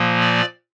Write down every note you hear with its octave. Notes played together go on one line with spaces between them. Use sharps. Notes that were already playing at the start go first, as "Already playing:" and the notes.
Already playing: A#2 F3 A#3
D5